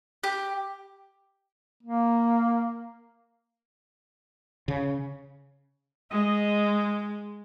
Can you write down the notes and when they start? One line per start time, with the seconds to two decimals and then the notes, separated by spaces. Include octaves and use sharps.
0.24 G4
1.83 A#3
4.68 C#3
6.11 G#3 D#5